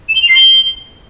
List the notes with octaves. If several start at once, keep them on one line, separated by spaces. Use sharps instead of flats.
E7
G7
F7
C7
G7